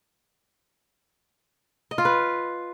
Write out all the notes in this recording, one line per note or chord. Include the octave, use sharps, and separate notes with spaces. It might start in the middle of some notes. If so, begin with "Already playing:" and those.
D#5
F4
B4